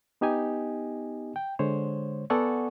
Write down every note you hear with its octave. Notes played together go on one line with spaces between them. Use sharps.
B3 D#4 G4 D#5 G#5
G5
D3 G#3 C5 C#5
B3 A4 D5 F#5 G#5 C#6